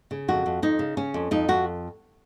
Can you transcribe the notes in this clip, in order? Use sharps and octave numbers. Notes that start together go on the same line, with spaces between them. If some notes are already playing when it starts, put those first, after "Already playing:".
C#3
F2 F#4
F2
F2 D#4
C#3
C#3 C#4
F2
F2 D#4
F2 F#4